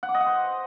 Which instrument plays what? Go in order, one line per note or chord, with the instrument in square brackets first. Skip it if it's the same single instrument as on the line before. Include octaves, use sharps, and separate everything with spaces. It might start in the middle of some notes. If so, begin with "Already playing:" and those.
[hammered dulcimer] F#5
D6
D#5
F#5
C5